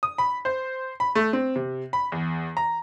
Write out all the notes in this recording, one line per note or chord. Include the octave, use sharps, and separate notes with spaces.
D#6
B5
C5
B5
A3
C4
C3
B5
E2
A#5